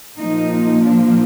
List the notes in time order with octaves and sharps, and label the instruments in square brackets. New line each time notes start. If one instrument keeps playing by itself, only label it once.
[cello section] A#2 F3 A#3 D#4
D4